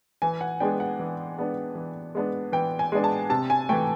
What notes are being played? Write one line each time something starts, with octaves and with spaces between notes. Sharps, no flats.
E3 G#5
F#5
G#3 B3 D4 G5
F#5
E3
G#3 B3 D4
E3
G#3 B3 D4
E3 G5
G#5
G#3 B3 D4
A5
C3 A5
G#5
E3 A3 G5